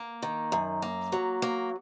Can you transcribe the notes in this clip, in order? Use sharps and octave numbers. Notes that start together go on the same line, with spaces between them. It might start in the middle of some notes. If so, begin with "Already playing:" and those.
Already playing: A#3
D#3
F#2
A#3
F#3
A#3